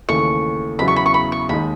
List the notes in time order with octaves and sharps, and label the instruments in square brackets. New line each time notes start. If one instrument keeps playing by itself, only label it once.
[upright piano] D#2 C#3 E3 A3 [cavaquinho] C#6
[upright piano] E2 C#3 F#3 B3 E4 [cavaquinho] B5
[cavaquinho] C#6
B5
C#6
B5
C#6
[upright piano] D#2 D#3 G#3 D#4 [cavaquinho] B5